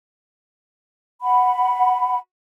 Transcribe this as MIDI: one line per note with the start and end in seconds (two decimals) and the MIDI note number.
1.23 2.17 78
1.23 2.17 83